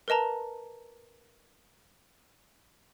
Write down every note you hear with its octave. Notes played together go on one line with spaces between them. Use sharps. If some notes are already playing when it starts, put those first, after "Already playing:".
A#4 B4 D#5 A5 A#5